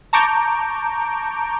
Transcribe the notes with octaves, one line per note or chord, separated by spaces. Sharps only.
A5 A#5 C#6 D6 G6 D7